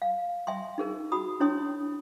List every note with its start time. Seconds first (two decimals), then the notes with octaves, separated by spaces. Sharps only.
0.02 F5
0.47 E5 G#5 C6
0.78 D#4 G#4 A#4
1.12 F#4 B5 D#6
1.40 D4 E4 C#5 G#5 C6 D#6